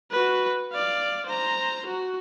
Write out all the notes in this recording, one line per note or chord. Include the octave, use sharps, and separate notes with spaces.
F#4 B4
D5 F5
C5 A#5
F#4